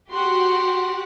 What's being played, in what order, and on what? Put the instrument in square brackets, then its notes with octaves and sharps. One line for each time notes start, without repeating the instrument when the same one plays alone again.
[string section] F#4 G4 F#5 [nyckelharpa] C6